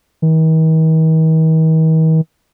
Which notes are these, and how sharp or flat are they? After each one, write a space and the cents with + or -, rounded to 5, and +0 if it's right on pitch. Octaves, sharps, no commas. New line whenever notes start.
D#3 +45